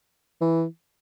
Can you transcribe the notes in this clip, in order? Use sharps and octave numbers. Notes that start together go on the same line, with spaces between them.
E3